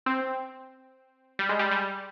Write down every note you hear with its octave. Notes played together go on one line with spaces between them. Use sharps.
C4
G3
G#3
G3
G3